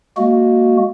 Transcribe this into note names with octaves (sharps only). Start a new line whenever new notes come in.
G#3 A#3 F#4